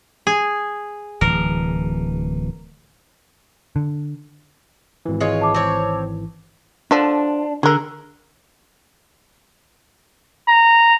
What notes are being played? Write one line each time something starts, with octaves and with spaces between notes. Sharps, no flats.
G#4
D1 E3 A#4
D3
G#1 E3
G#3 F4 C#5
A5 D6
C4 C#5
D3 F3 D4
D3 G#4 A#4
A#5